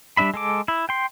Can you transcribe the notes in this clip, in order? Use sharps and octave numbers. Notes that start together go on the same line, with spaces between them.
G3 A#3 D4 E5 B5
G#3 A4 D6
E4
G5 C6